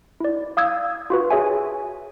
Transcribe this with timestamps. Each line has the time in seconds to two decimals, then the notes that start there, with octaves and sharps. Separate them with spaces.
0.20 E4 D5
0.57 F5 D#6 E6 G#6
1.10 F4 F#4 B4
1.30 G#4 C#5 E5 G#5